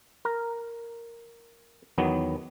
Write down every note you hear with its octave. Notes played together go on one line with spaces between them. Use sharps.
A#4
E2 D#3 F#3 B3